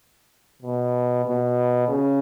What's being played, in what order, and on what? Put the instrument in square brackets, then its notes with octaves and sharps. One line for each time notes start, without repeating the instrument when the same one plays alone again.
[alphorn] B2
B2
C#3